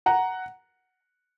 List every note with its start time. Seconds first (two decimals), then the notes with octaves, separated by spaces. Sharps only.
0.06 F#5 A#5